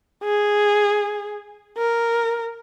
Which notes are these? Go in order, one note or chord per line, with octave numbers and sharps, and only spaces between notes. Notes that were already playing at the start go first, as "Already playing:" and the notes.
G#4
A#4